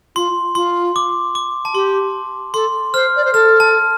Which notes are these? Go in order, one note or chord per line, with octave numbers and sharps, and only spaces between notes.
F4 C6
F4 C6
D6
D6
A5
G4 C6
A4 C6
C5 F6
D5
C5
A4 F6
A5